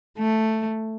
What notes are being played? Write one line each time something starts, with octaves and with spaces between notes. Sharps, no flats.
A3